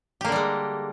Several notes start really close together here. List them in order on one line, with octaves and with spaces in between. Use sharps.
G4 A#3 D3 G3 G#3